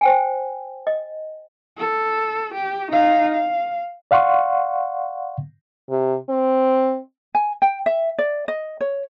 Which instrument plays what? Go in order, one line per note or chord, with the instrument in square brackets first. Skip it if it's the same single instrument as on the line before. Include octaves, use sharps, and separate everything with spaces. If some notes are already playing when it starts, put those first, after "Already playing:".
[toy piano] C5 G5 G#5
D#5
[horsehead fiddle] A4
G4
D#4 F5
F5
[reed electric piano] D5 F5 F#5 C6 C#6
[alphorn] C3
C4
[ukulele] G#5
G5
E5
D5
D#5
C#5